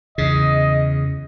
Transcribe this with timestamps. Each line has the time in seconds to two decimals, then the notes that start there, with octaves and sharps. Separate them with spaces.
0.18 E2 C#3 D#5